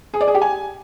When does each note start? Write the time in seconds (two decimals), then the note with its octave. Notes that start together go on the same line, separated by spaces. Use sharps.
0.14 G#4
0.21 D5
0.28 G#4
0.35 G4
0.42 G#5